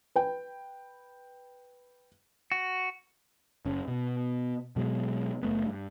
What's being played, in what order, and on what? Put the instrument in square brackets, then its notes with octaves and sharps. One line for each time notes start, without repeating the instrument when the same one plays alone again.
[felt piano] B4 G5
[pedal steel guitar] F#4
[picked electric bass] F#1 C#4
B2
B2 F#3 G#3
F#1 A3 B3
G2